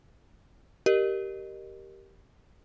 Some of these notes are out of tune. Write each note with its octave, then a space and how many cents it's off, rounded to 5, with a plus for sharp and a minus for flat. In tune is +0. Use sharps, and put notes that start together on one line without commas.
G4 -10 A#4 +0 D#5 -30